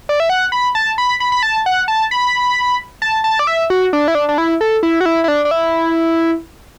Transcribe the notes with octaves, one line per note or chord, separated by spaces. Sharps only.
D5
E5
F#5
B5
A5
B5
B5
B5
A5
F#5
A5
B5
A5
A5
D5
E5
F#4
D4
E4
D4
D4
E4
A4
E4
F#4
E4
E4
D4
D4
E4